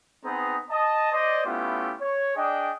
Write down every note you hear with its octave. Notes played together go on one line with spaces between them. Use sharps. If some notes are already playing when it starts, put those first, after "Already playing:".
B3 C4 D#4 G#4 B4 A#5
D#5 A5
C5 D5 D#5
A3 B3 C#4 E4 F4 G4
C#5
D4 G#4 D5 D#5 G5